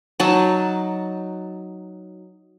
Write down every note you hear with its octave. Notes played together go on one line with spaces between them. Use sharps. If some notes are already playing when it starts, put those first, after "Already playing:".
F#3 D#4 A5